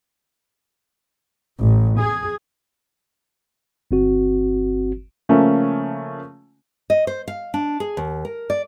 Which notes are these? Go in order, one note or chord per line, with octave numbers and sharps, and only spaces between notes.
A1
G#4
G1 C4 F#4
C#3 F3 A3 A#3 C#4
D#5
C5
F5
D4
G#4
D#2
A#4
D5